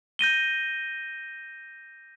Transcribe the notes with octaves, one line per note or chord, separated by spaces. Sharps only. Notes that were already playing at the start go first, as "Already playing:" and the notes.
G6 A#6 D#7 G7